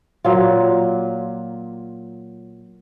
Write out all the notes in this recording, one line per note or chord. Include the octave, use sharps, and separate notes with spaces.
A#2 F#3 F4